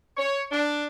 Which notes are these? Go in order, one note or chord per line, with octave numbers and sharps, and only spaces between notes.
C#5
D4